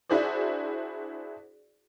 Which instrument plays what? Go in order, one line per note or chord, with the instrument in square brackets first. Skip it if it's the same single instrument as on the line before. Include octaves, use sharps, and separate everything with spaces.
[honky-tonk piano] D4 E4 F#4 G#4 C5 D5